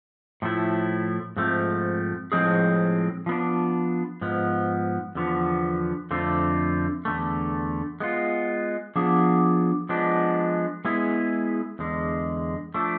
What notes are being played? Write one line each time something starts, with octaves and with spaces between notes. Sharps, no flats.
A2 F3 A3 E4
G#2 F3 A3 C4
A2 F3 G#3 C4 G#4
F3 B3 D4
G#2 F3 B3
E2 D3 F3 B3
F2 D3 A3 C4 F4
E2 D3 A3
G#3 B3 F4
F3 B3 D4 G#4
F3 G#3 B3 D4
G#3 B3 E4 G#4
E2 D3 G#3
F3 A3 D4